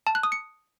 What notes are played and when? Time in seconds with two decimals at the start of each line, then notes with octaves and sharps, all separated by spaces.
0.07 A5
0.15 F#6
0.23 D#6
0.32 C#7